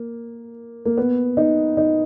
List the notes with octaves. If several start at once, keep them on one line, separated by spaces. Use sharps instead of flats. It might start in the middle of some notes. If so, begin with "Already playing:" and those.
Already playing: A#3
A#3
B3
D#4
D#4